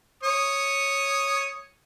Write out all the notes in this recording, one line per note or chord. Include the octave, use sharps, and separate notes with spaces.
C#5 D#6